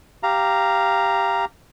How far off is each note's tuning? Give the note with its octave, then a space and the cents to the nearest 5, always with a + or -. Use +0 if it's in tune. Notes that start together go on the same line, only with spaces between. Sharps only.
G4 +0 F5 -10 A#5 +0